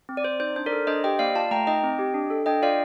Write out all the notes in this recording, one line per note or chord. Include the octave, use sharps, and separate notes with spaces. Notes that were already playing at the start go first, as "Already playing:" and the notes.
C4
D5
C4 C5
D#4 C5
D4 C5
A#4 D5
A4
D4 C5 D#5
G4 D#5 G5
A#3 D5 F5
F4 F5 A5
A3 G5 A#5
D#4 D#5 G5
C4
G4
D4
A4
D4 D#5 G5
F4 D5 F5